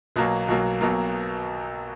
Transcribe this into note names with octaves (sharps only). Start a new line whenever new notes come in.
B1 B2 F#3 A#3
B1 B2 F#3 A#3
B1 B2 F#3 A#3